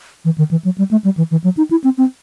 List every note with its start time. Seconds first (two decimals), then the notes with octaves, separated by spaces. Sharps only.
0.25 E3
0.38 D#3
0.51 E3
0.65 F#3
0.78 G3
0.91 A3
1.04 G3
1.17 E3
1.31 E3
1.44 F#3
1.57 D#4
1.71 E4
1.84 C4
1.98 C4